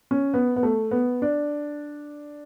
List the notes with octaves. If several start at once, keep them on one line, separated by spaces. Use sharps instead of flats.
C#4
B3
B3
A3
B3
D4